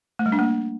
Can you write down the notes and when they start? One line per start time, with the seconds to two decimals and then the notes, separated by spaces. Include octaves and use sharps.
0.19 A3
0.26 G3
0.32 D4
0.39 A#3